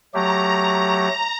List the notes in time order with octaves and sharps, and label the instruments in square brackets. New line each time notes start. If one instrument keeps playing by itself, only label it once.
[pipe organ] F#3 A3 G4 [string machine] A#5